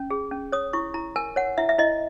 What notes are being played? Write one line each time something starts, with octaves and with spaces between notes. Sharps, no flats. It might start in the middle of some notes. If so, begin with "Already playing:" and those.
Already playing: C#4
G#4
C#4
C#5 D#6
E4 C#6
E4 A#5
A#4 G#5
C#5 F#5
E4 E5
E5
E4 D#5